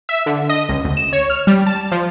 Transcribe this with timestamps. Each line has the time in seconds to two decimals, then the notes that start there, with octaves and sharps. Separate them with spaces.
0.09 E5
0.26 D3
0.49 D#5
0.69 C#2
0.84 D2
0.97 E7
1.13 C#5
1.30 F6
1.47 G3
1.66 A5
1.92 F3